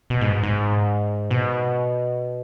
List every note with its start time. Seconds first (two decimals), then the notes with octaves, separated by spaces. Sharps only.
0.10 B2
0.21 G#2
0.43 G#2
1.31 B2